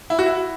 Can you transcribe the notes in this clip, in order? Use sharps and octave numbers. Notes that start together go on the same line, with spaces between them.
E4
F#4
E4